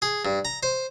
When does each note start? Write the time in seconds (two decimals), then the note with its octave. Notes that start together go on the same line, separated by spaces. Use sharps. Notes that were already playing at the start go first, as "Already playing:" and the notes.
0.02 G#4
0.25 G2
0.45 A#5
0.63 C5